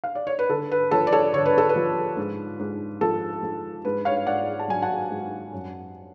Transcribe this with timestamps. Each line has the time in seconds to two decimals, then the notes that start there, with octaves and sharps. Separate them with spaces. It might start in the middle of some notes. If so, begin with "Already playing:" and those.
0.04 F5
0.15 D5
0.27 C#5
0.39 B4
0.50 D3 A4
0.72 B4
0.91 F3 A4 C#5
1.07 D5
1.12 A4 C#5
1.34 D3 C#5
1.46 B4
1.58 A4
1.69 B4
1.76 F3
2.17 G#2
2.59 G#2
3.01 F3 A4
3.43 F3
3.85 G#2 B4
4.05 C#5 F5
4.26 G#2 D5 F#5
4.59 A5
4.68 F#3 G#5
4.82 F#5 A5
5.10 G#2
5.52 F#2